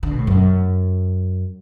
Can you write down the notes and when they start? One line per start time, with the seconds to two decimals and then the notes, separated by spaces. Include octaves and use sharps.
0.03 D3
0.11 B2
0.19 A2
0.27 F#2